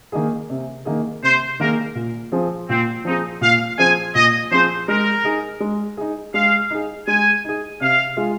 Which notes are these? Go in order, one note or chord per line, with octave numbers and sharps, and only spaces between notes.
D#3 A#3 D#4 G#4
C3
D#3 A#3 D#4 G#4
C3 C5
D#3 A#3 D#4 G#4 A#4
A#2
F3 C4 G#4
A#2 C4
F3 C4 D#4 G#4
A#2 F5
F3 C4 G#4 G#5
A#2 D#5
F3 C4 G#4 C5
G#3 A#4
D#4 G#4
G#3
D#4 G#4
G#3 F5
D#4 G#4
G#3 G#5
D#4 G#4
C3 F5
G#3 F4 G#4